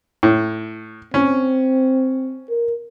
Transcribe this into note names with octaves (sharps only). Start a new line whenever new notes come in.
A2
C4 C#4
A#4